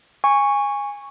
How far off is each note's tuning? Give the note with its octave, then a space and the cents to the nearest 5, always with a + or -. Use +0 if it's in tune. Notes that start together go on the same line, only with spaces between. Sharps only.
G#5 -15 C#6 +0